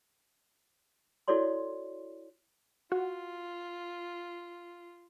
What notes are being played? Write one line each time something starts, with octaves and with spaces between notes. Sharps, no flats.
E4 F#4 A4 C#5 D5 C6
F4 F#4